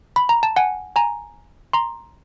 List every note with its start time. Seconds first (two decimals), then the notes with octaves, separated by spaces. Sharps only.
0.16 B5
0.29 A#5
0.43 A5
0.56 F#5 G#5
0.96 G#5 A#5
1.73 A#5 C6